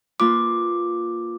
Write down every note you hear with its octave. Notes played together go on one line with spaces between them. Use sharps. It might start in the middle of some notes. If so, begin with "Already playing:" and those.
A#3 F4 B4 D6